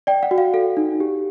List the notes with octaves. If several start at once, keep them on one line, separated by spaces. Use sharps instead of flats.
D5 G5
F#5
F#4
F5
A4 F5
D#4
G4